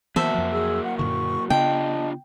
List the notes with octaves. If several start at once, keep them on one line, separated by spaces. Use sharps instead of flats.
E3 F#3 A#3 B3 F#4 C5 E5 A5
F2 F3
G#4 E6
F#5
F#2 A#2 D3 C#6
C#3 B3 D4 F4 D#5 G5 A5